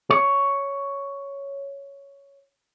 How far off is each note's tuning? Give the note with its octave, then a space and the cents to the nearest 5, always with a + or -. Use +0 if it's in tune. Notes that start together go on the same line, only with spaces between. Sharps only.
C#5 +5